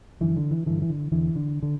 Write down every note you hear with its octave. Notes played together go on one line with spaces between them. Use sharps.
F#2 D3 E3
D3
E3
G2 D3 E3
E3
D3
E2 D3 E3
D3
D3